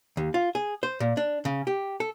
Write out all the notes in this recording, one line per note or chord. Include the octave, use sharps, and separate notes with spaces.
D#2
F4
G#4
C5
A#2
D4
C#3
G4
A4